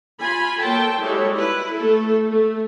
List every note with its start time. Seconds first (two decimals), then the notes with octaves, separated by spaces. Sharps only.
0.20 F4 G#5 B5
0.61 F#3 A#3 A4 C5 G5 A5
1.00 G3 G#3 E4 F#4 A4 C#5
1.37 E4 B4
1.76 A3 A4
2.30 A3